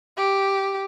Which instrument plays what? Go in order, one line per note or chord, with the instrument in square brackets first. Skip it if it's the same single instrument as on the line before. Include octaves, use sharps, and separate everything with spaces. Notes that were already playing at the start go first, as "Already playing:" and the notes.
[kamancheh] G4